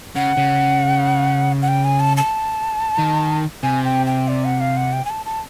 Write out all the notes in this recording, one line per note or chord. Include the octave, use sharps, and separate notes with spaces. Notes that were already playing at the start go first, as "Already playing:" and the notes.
C#3 F#5
C#3
F#5
G5
G#5
A5
A5
D#3
C3 G#5
G5
G5
D5
F#5
F5
F#5
G5
G#5
A5
A5